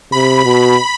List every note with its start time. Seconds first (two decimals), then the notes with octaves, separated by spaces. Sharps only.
0.12 C3 B5
0.45 B2